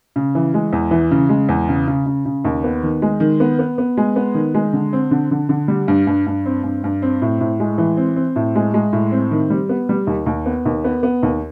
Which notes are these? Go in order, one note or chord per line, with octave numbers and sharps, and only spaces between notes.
C#3
E3
G#3
E2
E3
C#3
G#3
E2
C#3
C#3
C#3
C#3
D#2
B3
D#3
G#3
D#3
B3
B3
B3
G#3
B3
D#3
G#3
D3
C4
D3
D3
D3
G3
G2
G2
G2
C4
G2
G2
C4
A2
A2
G#3
E3
C4
C4
A2
G#3
G#3
A2
C4
D#3
G3
B3
G3
D#2
D#2
B3
D#2
B3
B3
D#2